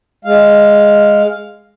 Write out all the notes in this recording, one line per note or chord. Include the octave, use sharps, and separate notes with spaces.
G#3 F5